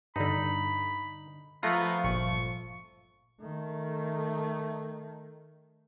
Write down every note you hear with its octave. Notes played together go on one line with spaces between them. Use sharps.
G2 D3 D#4 B5
F3 A3 B3 F4 A#5
G1 A#2 C#6
D#3 A3